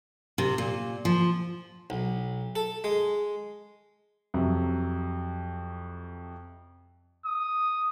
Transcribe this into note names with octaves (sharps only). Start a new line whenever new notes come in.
C3
A#2
F3
B1
A4
G#3
F2 C3 F#3
D#6